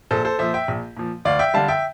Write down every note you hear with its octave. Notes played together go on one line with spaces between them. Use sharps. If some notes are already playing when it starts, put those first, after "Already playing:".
A#1 A4 C5
A4 C5
A#2 F3 C5 E5
E5 G5
A#1
A#2 F3
D2 D5 F5
E5 G5
D3 G3 F5 A5
E5 G5